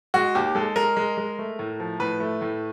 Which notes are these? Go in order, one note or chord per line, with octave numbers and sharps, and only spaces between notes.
G#3 F#4
D#2 G4
G#3 A4
G#3 A#4
G#3
G#3
A3
A2
F3
A2 B4
A3
A2